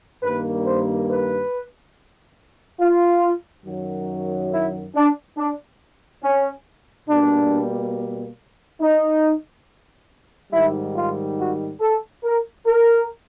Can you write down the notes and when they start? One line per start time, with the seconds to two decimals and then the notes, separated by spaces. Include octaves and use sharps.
0.23 G2 D#3 G3 A#3 B4
0.65 C5
1.09 B4
2.80 F4
3.65 F#2 D#3 F#3
4.52 E4
4.95 D4
5.37 D4
6.23 C#4
7.09 B2 G3 A#3 D4
8.81 D#4
10.52 G#2 D#3 G3 E4
10.95 F4
11.38 F#4
11.81 A4
12.24 A#4
12.66 A#4